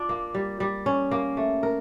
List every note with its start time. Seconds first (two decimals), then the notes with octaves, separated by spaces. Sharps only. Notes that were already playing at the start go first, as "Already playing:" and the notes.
Already playing: D4 F4
0.09 A#3
0.35 G3
0.60 G3
0.86 C#4
1.11 A#3
1.37 A3
1.63 A#4